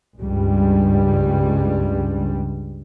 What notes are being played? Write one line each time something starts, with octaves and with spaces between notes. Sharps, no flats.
C#2 G2 G3